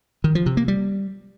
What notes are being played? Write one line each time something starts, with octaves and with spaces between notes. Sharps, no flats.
D#3
F3
C3
A#3
G3